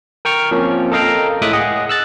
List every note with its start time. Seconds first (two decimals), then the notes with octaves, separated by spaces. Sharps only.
0.25 A#4 G5 C#6 F6
0.51 F3 A#3 C4 C#4
0.92 A4 A#4 D#5 F5 G5 A#5
1.42 A2 G#3 E5 D6 D#6 F#6
1.53 G#4 D#5 F#5
1.89 E6 F#6 A6